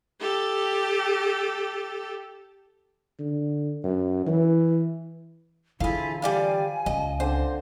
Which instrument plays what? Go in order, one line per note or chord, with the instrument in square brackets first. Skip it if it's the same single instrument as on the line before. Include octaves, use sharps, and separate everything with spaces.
[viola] G4 A4
[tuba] D3
F#2
E3
[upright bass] D3 E3 [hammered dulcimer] F3 [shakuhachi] E4 [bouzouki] F4 G#4
[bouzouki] G3 D5 F5 [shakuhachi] G#5
[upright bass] C#2 [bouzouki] D#5
[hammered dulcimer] D3 C4 D6 [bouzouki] C5